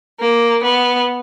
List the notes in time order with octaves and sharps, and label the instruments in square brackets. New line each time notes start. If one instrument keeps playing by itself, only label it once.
[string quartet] A#3
B3